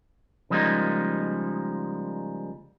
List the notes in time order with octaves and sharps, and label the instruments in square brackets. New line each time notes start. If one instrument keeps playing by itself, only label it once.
[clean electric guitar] C#3 F3 G3 G#3 A#3 D#4